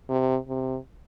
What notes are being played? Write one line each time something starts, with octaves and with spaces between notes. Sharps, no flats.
C3
C3